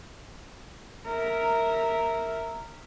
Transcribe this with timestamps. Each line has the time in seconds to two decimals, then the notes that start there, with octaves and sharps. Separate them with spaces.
1.06 A#4 E5